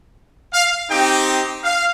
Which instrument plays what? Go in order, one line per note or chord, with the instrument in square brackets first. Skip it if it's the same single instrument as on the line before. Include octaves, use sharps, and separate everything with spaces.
[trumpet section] F5
C4 D#4 G4 G5
F5